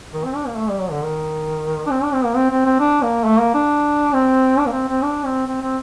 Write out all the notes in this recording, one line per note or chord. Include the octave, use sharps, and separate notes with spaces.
D#3
C4
D4
A#3
A3
G3
F#3
D3
D#3
D4
C4
D4
C4
A#3
C4
C4
C4
D4
A#3
A3
A#3
D4
C4
D4
A#3
C4
C4
D4
C4
C4
C4